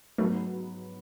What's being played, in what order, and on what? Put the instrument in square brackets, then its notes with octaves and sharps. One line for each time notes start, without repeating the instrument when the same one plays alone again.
[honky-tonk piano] G#2 F#3 B3 F#4 B4 [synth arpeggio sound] A3